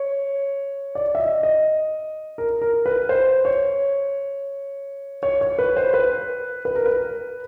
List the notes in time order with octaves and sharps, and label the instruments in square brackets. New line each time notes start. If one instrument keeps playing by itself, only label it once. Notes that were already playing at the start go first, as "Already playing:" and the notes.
Already playing: [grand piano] C#5
D5
E5
D#5
D#5
A#4
A#4
B4
C5
C#5
C#5
C#5
B4
C5
B4
B4
A#4
B4